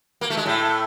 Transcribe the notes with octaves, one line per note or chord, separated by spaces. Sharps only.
A#3
A3
G#3
A2 A3